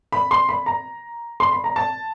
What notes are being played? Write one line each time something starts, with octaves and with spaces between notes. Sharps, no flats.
B5
C6
B5
A#5
C6
B5
A#5
A5